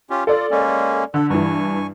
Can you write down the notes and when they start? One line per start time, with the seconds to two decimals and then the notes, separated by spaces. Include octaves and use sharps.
0.10 C#4 F4 G4
0.27 F4 A4 D5
0.51 G#3 A#3 C#4
1.14 D3 A4
1.30 G2 E3 G#5 C#6